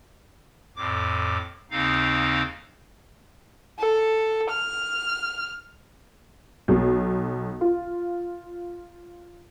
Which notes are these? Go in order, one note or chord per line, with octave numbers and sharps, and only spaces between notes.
F2 A2 D6
D#2 C#3 C4 D#4 F5
A4
F6
B1
F4